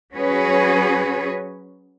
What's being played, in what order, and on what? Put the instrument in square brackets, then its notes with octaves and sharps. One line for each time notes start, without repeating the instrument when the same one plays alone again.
[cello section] F#3 C#4 F#4 G#4 B4 C#5